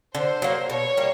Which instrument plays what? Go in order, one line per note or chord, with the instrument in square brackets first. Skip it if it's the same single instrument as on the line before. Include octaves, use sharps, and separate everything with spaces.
[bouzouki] D3 [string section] C5
[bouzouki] F#3 A#3
[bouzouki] B2 [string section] C#5
[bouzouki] G3 A#3